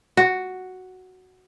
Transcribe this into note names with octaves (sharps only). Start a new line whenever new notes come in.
F#4